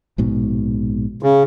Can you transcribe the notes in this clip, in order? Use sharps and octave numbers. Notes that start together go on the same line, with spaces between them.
A#1 G#2 B2
C#3